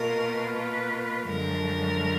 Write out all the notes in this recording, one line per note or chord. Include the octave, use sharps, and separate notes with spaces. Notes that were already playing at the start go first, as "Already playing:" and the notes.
Already playing: B2 A#3 F4 A#4
B4
F#2 D3 F3 G#3 A#4